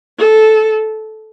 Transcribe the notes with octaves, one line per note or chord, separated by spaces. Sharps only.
A4